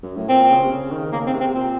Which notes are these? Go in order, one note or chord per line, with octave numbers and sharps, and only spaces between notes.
F#2
A2
A#2 C4
C#3
C3
C#3
D#3
C#3 A#3
C4
C3
C4
C3
A#2 C4